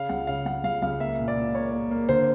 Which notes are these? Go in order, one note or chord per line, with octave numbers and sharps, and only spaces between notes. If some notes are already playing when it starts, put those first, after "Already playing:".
Already playing: C#3 F5
C#2 F#5
C#3 F5
C#2 F#5
C#2 F5
C#2 F5
A#3 E5
A#2
D5
A#2
A#3 C#5
A#3
A#3
D3 C5